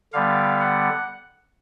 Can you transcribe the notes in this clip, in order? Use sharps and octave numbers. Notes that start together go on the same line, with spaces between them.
D3 G3 B3 F5
F#5